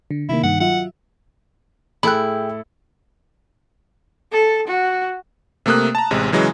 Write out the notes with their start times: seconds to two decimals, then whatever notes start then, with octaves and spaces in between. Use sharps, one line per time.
0.11 D3
0.29 C3 D#3 A#3 E4
0.43 G2 D#3 F#5
0.60 F#3 F4 E5 F#5
2.03 A2 E4 G#4 A4 G5 B5 F#6
4.32 A4
4.67 F#4
5.66 C3 A3 A#3 D#6 F#6
5.95 A5 A#5
6.11 A1 C3 G#3
6.32 C#3 E3 F#3 G#3